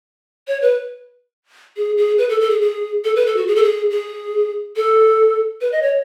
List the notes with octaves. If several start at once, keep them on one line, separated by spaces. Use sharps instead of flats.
C#5
B4
G#4
G#4
B4
A4
A4
G#4
G#4
A4
B4
A4
F#4
G#4
A4
G#4
G#4
A4
B4
D#5
C#5